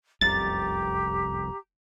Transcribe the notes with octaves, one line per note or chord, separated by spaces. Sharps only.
F1 C2 F#2 G4 A#5 A6